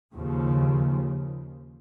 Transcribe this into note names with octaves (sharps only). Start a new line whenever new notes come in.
D#2 C#3 F3